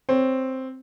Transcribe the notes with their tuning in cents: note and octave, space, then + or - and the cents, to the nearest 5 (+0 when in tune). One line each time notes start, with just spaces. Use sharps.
C4 +0 C#5 +0